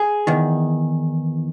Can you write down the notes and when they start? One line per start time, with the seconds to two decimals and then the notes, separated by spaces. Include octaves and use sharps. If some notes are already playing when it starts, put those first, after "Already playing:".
Already playing: G#4
0.27 E2 D#3